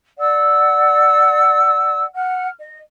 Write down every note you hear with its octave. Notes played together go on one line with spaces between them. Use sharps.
D5 F#5 E6
F#5 F6
D#5